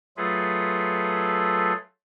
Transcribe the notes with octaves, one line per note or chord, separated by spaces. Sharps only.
F#3 A3 F4 G#4 A4 B4